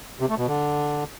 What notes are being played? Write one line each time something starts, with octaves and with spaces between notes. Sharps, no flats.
C3
A3
B2
D3